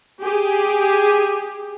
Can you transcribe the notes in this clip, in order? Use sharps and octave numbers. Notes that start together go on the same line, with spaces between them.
G4 G#4